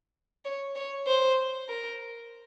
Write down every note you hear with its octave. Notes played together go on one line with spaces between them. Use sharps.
C#5
C#5
C5
A#4